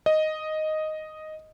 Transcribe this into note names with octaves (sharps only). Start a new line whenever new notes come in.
D#5